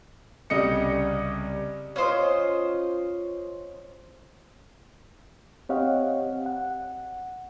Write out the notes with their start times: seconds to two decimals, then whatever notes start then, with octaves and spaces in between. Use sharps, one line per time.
0.50 C2 C#3 G3 D#5 C#7
1.96 C#4 F4 C5 D#5
5.69 C4 G4 C#5 D#5 F5 F#5
6.46 F#5